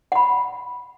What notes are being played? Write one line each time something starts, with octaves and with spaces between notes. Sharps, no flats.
F#5 B5